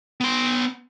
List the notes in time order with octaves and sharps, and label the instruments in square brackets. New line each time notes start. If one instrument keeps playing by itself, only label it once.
[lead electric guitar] B3 C6